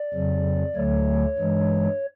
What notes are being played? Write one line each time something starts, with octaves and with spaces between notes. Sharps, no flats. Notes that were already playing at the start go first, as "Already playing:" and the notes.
Already playing: D5
F2 C#3 F#3
D2 D3 F#3 A3 C#5
G2 E3 G#3